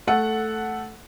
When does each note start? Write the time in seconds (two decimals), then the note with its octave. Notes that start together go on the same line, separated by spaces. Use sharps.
0.07 A3 A4 F#5